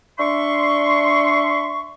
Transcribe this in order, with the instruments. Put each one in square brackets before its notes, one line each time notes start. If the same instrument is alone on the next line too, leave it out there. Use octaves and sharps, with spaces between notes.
[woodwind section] D4 E5 C6 C#6